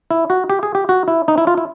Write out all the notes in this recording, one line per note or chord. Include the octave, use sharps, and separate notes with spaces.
E4
F#4
G4
G#4
G4
F#4
E4
D#4
E4
F4
E4